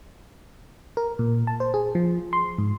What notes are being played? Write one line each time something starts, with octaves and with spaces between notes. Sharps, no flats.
A#4
A#2
A5
C5
G#4
F3
C6
G#2